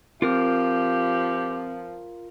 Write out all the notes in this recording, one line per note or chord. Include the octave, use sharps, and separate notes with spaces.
F3 C4 F4 G4 A#4 F6